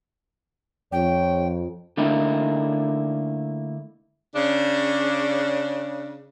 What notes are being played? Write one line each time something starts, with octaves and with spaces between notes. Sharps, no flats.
F2 C#5 G5
D3 A3 A#3 D#4 E4
C#3 D4